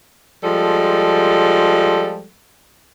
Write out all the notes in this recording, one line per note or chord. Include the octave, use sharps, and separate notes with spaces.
F3 G3 G#3 A4